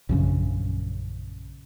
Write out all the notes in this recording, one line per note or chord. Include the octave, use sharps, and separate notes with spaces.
A#1 F#2 C#3